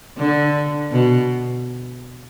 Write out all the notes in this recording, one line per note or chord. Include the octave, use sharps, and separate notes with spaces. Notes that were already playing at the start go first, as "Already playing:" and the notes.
D3
B2